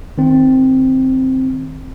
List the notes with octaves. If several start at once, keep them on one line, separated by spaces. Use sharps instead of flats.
D#3 C4